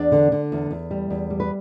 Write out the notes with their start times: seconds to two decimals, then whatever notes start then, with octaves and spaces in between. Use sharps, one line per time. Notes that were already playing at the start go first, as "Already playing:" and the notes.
Already playing: E2 D4 D5
0.12 D3
0.32 D3
0.52 E2
0.71 E2
0.91 G3
1.10 E2
1.30 G3
1.40 B4